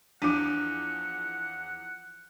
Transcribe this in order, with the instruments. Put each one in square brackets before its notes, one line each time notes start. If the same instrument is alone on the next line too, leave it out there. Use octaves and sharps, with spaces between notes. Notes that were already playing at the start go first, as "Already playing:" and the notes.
[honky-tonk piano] E2 F3 [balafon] D4 [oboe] F#5 [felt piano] D6 D#7